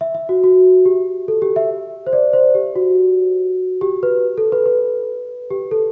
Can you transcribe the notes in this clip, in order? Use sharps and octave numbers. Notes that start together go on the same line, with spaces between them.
E5
E5
F#4
F#4
G4
A4
G4
E5
C5
D5
C5
G4
F#4
G4
B4
A4
B4
B4
G4
A4